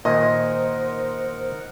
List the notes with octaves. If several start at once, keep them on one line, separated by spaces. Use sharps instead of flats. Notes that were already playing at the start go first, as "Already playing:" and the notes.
A#2 D#3 D#4 A#4 C5 D#5 F#5